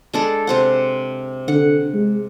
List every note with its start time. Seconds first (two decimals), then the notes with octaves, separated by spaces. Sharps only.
0.13 G#3 D4 A4
0.47 C3 C5 F#5
1.48 D3 F#5
1.94 G#3